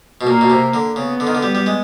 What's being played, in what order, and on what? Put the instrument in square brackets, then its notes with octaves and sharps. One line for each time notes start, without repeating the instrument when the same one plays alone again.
[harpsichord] B2
[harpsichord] A#2 [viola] A#3
[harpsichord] B2
C3
D3
[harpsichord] C#3 [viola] B3
[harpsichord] D3
D#3
D3
G3
G3
G#3